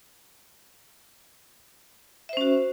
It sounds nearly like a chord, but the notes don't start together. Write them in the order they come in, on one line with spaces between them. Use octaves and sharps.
E5 C5 C#4 F#4